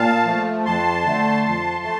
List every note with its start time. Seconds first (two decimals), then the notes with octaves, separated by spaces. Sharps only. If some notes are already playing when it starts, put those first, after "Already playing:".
Already playing: A#2 F5 A5
0.26 F3 A3
0.65 F2 A5 C6
1.06 D3 A3
1.45 F2
1.84 A3